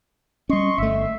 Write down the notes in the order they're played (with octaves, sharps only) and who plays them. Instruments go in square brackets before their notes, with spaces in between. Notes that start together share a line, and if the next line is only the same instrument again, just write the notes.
[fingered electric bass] G3 C#4 [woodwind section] D#5 C6 C#6
[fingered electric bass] G1 A3 [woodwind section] E5